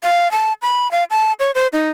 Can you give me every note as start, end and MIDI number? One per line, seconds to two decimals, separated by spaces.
0.03 0.31 77
0.31 0.53 81
0.62 0.90 83
0.92 1.04 77
1.10 1.33 81
1.40 1.51 73
1.55 1.67 72
1.73 1.90 63